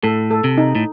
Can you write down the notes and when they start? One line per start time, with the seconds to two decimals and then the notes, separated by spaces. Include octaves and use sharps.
0.03 A2 A4
0.31 A4
0.44 C3
0.58 D#4
0.75 A2